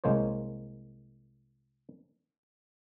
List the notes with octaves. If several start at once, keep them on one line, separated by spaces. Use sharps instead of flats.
C2 G#3 A#3 C5 C#5